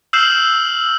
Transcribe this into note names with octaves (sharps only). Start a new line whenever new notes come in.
E6 F6 G6 C7 E7 F#7